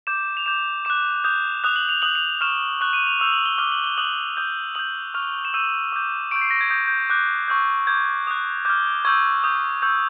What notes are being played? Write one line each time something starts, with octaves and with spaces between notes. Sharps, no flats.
D6 G6 E7
F7
D6 G6 E7
D6 F#6 E7
D#6 G6
D#6 F#6 F7
F#7
F7
D#6 F#6 F#7
F7
C#6 F6 E7
C#6 F#6
D#7
F7
C#6 E6 G6 F7
F#7
G7
D6 F6 G7
F#7
G7
D#6 F#6 F#7
D#6 G6
D#6 G6 F#7
C#6 F6 F7
E7
C#6 E6 G6 D#7
D6 G6
C#6 E6 G6 D7
C7
A#6
G#6
D#6 G6
G6
D6 F#6 G6
C#6 E6 G6
D6 G6 G#6
D#6 F#6
D6 F6 G6
C#6 E6 G6 G#6
D#6 G6
C#6 E6 G6